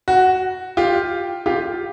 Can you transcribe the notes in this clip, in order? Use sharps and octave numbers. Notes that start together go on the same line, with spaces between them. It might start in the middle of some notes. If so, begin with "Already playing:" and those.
F#4
F4 G4
F4 G4